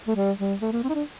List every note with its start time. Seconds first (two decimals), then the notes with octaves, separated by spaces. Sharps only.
0.08 A3
0.16 G3
0.39 G3
0.62 A3
0.72 A#3
0.84 C4
0.89 D#4
0.95 D4